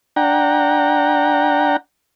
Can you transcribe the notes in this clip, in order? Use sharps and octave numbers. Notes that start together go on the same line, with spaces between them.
D4 F#5 G5 A#5